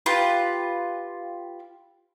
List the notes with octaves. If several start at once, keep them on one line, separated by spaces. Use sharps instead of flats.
F4 G4 B4